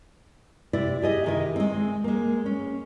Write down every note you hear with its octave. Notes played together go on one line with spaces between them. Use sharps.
C3 E4 D5
G4 G#4 D#5
C3 D#3 E4
G#3 C4
G#3 A#3
C#4